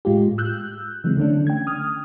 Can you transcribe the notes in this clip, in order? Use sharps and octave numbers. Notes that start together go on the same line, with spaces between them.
A2 G#3 F4 G4
E6 F#6 G6
C#3 E3 F#3 G#3 C4
D3 A3 C#4 D4
G5 G#6
D#6 F6